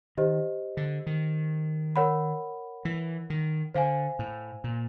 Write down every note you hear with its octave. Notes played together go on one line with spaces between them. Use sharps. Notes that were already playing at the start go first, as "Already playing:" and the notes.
D#3 G4 C5 D#5
D3
D#3
A#4 C#5 F#5 B5
E3
D#3
D3 C5 F5 G#5
A2
A#2